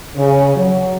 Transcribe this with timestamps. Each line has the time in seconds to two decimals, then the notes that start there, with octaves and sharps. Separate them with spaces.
0.16 C#3
0.56 F#3